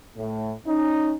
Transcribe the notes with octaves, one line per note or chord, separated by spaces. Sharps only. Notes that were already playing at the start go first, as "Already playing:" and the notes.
A2
C#4 D#4